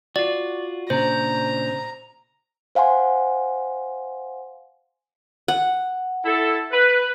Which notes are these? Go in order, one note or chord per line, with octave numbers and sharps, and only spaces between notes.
F4 F#4 D5
A#2 C#3 D4 C5 A#5
C5 F5 F#5 G#5 C6
F#5
E4 A4
B4